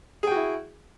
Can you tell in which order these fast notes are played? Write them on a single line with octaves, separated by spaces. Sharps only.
G#4 G5 F#4 E4